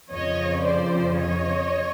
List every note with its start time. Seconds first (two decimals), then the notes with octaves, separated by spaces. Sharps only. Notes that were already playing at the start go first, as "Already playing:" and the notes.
0.11 F2 C#3 F3 C#5 D#5
0.65 C5 D5
1.17 C#5 D#5